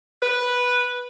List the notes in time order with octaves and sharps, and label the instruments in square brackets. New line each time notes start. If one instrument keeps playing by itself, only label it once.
[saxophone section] B4